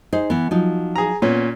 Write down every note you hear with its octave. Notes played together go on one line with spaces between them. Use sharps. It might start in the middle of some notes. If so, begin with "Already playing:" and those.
D#4 G#4 C5
E3 B3
F3 F#3 D#4
G#4 A#5
A#2 B3 C#4